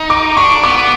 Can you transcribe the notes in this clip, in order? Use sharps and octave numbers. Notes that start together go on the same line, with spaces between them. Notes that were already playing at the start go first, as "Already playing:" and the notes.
Already playing: D#4
D6
D4 C#6
B3 D6